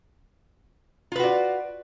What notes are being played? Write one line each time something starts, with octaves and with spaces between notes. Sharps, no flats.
F4 F#4 B4 D5